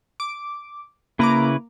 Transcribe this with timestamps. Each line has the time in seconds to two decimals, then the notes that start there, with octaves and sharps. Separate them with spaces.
0.20 D6
1.19 C#3 A#3 E4 B4 A#5 D6